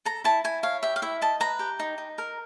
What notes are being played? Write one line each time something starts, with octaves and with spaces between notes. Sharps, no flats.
A4 A#5
E4 A5
E4 G#5
C#5 F5
G4 E5
F5
E4 E5
D#5 A5
B4 A#5
G4
D#4
D#4
A#4